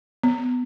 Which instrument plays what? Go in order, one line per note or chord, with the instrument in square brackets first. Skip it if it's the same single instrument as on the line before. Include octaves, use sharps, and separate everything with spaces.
[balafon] B3